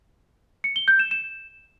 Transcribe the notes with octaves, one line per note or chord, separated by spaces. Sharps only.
C#7
G7
G6
E7
E7